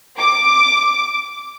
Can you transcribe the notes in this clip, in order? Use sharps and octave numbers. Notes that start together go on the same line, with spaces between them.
D6